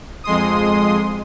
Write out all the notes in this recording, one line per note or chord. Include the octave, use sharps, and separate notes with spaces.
F2 G#3 C6 D#6